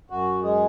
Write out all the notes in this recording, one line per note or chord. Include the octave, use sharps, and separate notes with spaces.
F#2 F#4
G#3 G#4